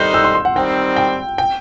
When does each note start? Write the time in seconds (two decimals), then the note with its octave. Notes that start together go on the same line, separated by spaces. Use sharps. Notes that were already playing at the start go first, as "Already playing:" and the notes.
Already playing: D#3 G3 D#4 A4 C5 F#6 G6
0.14 E6
0.24 C6
0.35 C6
0.45 F#5
0.56 D#3 G3 C4 G5
0.96 G5
1.38 G5